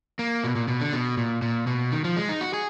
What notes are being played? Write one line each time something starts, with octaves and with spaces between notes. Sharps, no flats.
A#3
B2
A#2
B2
D3
B2
A#2
A#2
B2
D#3
F3
G#3
D#4
F#4
G#4